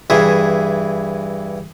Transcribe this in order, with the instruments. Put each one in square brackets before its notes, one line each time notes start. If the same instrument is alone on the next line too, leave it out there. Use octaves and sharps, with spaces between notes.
[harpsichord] G2 E3 G#4 E5 D#6